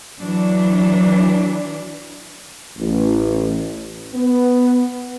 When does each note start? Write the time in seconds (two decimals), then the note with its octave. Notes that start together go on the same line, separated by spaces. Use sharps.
0.19 E3 F#3 D4
2.78 A1
4.14 B3